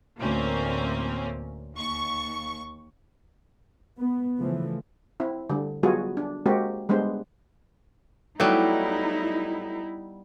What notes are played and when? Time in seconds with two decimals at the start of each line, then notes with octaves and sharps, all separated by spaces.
0.18 D2 A2 A#3 C4 C#4
1.74 D#2 C#6
4.00 B3
4.40 C#3 E3 F3 A3
5.20 C4 E4
5.50 D3 G3
5.83 F#3 G3 B3 F4 F#4 G#4
6.17 D4
6.46 G#3 A#3 C4 F#4 G4
6.89 G3 G#3 B3 D4 C5
8.40 F#3 G3 A3 B3 D#4 E4